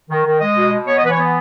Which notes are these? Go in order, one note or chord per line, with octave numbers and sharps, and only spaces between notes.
D#3
D#3
G#3 D#5
B2
B2
B3 C#5
D#5
E3 B4
C#5
B3